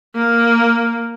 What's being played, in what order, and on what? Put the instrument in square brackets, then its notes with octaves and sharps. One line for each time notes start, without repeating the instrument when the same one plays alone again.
[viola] A#3